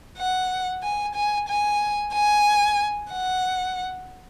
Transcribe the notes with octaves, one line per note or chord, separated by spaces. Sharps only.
F#5
G#5
G#5
G#5
G#5
F#5